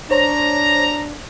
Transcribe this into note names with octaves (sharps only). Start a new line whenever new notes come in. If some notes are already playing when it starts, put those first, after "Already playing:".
D4 C5 C#5 A#5